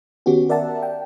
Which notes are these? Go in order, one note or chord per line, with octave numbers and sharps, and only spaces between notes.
D#3 B3 C#4 F#4 G4
A#4 D5 E5 F#5 A5
G5